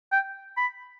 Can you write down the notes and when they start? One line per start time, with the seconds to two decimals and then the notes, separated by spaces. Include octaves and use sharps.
0.12 G5
0.57 B5